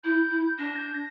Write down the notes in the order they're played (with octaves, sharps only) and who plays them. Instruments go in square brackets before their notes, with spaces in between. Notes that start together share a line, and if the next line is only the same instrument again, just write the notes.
[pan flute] E4 [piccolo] G6
[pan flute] E4
[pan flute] D4 [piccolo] A#6
[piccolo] G6
A#6